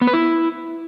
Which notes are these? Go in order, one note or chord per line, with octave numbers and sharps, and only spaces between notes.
B3
B4
E4